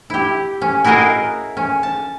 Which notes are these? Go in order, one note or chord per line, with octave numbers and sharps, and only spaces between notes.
E4 G4
C#4
E4 F#4 G#4 A#4 D#5 F5
C#4
A5